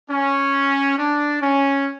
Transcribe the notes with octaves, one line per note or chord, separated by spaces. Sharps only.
C#4
D4
C#4